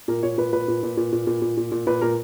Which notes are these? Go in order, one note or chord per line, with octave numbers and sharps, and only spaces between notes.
A#2 A#4
A#2 C#5
A#2 B4
A#2 B4
A#2
A#2
A#2
A#2
A#2
A#2
A#2
A#2
A#2 B4
A#2 A#4